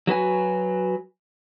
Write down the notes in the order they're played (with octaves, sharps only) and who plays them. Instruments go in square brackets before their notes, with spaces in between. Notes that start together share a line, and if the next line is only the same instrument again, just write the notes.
[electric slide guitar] F#3 F#4 B4 G#5